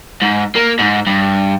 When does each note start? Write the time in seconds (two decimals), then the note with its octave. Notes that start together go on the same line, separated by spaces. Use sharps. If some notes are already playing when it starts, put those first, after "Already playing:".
0.22 G#2
0.55 A#3
0.79 G#2
1.07 G2